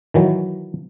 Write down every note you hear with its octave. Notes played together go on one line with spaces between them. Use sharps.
D#3 E3 F#3